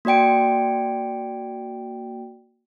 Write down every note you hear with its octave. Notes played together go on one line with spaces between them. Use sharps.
A#3 F#4 D5 G5 D7